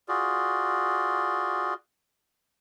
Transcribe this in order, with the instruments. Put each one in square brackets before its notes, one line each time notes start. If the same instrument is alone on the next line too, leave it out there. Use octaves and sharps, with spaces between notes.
[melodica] F4 F#4 G#4 D5